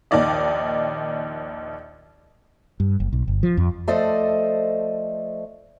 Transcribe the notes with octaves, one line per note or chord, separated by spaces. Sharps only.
A#1 D#2 D#4 D5 D#5
G2
F#1
B1
G1
F3
F2
F3 A3 A4 C5 D5 D#5